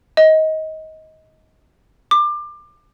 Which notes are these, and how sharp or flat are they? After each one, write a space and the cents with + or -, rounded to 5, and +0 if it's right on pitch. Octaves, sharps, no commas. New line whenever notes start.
D#5 +20
D6 +25